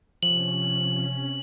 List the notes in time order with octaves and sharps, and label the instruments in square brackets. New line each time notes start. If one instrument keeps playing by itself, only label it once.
[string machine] C3 C#4 [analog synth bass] F3 [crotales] F#7